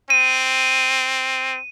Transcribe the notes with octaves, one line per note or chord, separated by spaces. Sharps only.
C4 D#7